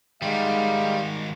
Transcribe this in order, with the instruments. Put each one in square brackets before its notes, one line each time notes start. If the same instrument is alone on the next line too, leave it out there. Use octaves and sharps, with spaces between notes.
[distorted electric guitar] G#2 D#3 [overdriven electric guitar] G3 [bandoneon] G#3 [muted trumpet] F5